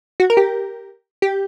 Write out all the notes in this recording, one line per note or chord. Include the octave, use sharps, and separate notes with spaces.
F#4
A#4
G4
G4